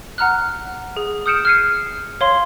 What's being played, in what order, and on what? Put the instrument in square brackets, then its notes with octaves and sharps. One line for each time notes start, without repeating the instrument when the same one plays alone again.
[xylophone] F#5 A#5 F6 F#6
G#4
D#6 F6 G6 C#7 D7 E7
F6 G#6 C7 C#7 D#7
C#5 F5 C6